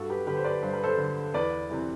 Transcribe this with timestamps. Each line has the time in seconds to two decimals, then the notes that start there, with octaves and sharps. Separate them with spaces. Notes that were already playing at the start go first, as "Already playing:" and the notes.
Already playing: G2 F#4 A4
0.10 G4 B4
0.27 D3 G4 B4
0.37 C5
0.44 B4 D5
0.62 G2 C5
0.73 B4
0.84 A4 C5
0.98 D3
1.34 E2 B4 D5
1.70 C3 E3